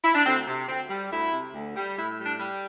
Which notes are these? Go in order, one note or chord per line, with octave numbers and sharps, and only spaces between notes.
E4
D4
D2 C4
C3
D2 C4
G3
D2 E4
C3
D2
G3
A2 E4
G3
D4
G3